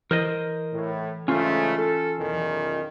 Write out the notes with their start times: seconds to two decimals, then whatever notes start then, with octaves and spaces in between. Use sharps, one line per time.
0.11 E3 A#4 C5 D#5
0.73 A2
1.28 G#2 C#3 A3 C#4 F4
1.76 A4
2.19 B1 E2 D#3